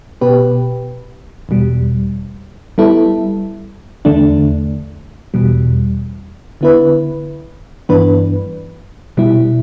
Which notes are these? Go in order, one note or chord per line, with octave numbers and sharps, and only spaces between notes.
B2 B3 G4 B4
E2 B2 G3
G3 B3 E4 A4
E2 D3 A3 D4
E2 B2 G3
D3 B3 E4 B4
G2 E3 B3 D4 B4
B2 G3 E4